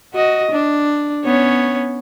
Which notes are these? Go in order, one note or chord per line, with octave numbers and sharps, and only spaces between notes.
F#4 D#5
D4
B3 C#4 C#5